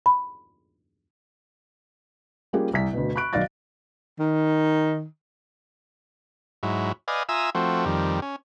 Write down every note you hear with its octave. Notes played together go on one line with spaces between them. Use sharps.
B5
G3 A#3 C#4 F4 G4 G#4
C2 B6
D2 B2
B5 C#6 F#6 D7
B1 D#3 D5 F5 A6 A#6
D#3
G#2 F#3 E4
B4 D5 D#5 F5 G#5
F4 E5 G#5 A#5 D#6 E6
F3 A3 C4 F#4
F2 D#3 G3
C#4